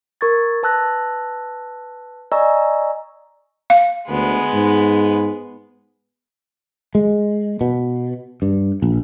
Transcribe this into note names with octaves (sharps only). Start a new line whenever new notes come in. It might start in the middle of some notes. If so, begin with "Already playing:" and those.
A#4 C#6 G#6 A6
B4 A5 E6 F#6 A#6
D5 D#5 G#5 A#5 C#6 E6
F5
D2 G#3 B3
G#2
G#3
B2
G2
A#1